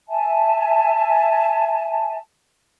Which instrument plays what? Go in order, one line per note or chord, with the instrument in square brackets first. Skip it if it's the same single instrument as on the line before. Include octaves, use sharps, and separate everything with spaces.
[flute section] E5 G#5 A5